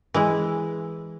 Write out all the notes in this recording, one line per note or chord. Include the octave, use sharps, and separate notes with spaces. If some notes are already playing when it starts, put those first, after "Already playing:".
E3 G#3 E4